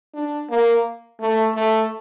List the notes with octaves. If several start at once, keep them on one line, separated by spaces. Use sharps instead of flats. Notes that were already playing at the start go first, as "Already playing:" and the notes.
D4
A#3
A3
A3